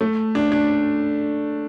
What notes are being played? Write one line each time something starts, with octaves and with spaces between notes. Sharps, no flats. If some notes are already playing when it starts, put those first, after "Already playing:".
A3
D4
D4